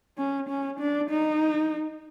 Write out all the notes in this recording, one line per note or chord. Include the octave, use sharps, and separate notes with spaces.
C#4
C#4
D4
D#4